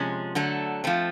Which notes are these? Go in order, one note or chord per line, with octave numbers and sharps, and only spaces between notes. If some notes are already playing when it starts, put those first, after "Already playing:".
Already playing: C3 F3 G#3 C#4
D3 F#3 A3
F3 A3 C4